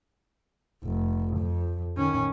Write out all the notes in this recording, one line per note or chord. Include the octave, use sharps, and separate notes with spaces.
F1
F2
D#3 C#4